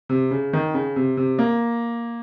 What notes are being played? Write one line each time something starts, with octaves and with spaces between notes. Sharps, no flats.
C3
C#3
D#3
C#3
C3
C3
A#3